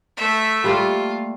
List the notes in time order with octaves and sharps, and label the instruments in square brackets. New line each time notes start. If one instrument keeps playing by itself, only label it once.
[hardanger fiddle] A3 E5
[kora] G3 A3 A#3 [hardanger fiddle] F4